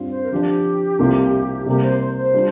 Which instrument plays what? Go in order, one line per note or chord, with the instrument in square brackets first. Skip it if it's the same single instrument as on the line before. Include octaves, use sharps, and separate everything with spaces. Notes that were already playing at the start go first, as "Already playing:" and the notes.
Already playing: [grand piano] G2 G3 C4 F4
[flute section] C5
A#4
[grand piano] D3 F3 D4 [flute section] G4
[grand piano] C2 C3 G3 A#3 F4
[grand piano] C3 G3 A#3 [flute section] G4
[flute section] C5
C5
C5
[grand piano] G3 D4 F4